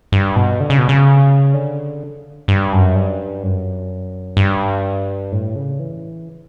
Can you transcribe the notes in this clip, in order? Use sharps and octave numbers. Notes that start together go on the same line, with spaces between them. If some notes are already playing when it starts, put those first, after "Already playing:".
G2
B2
D3
C#3
B2
C#3
D3
G2
F#2
G2
F#2
G2
A2
C#3
E3